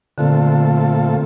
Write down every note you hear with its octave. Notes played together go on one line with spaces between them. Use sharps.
A#2 D3 A3 C4 F4 A4